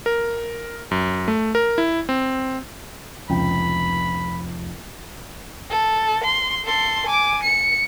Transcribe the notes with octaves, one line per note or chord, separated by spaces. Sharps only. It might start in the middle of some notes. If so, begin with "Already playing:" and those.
A#4
F#2
A3
A#4
E4
C4
F1 C#2 G5 B5
A4
C6
A4 C6
G#5 D6
C#7